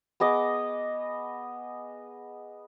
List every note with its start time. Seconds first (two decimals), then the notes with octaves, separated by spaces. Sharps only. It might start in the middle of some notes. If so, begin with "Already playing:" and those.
0.20 B3 G#4 D#5 D6